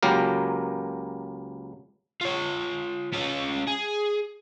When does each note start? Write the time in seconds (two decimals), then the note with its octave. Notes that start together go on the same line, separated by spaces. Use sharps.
0.03 C#2 F#3 A#3 G4 A#4
2.21 F4 C#5
3.13 C#4 F4
3.67 G#4